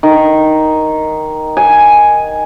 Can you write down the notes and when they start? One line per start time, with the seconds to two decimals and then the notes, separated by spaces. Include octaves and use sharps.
0.03 D#3
1.57 G#5